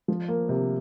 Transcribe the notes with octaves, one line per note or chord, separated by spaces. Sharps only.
F3
A#3
C3